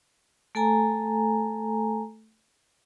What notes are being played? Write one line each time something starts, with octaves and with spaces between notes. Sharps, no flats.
A3 A4 G#5 A#5